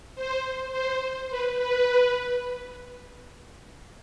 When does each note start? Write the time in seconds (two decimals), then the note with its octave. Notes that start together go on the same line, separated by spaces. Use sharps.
0.15 C5
0.72 C5
1.30 B4
1.59 B4